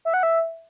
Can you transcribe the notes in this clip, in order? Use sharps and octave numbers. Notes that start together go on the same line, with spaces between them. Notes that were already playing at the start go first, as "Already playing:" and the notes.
E5
F#5
E5